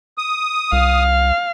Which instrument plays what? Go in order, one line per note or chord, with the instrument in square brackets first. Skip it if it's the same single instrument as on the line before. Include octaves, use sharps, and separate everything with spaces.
[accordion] D#6
[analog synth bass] C2 [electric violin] F5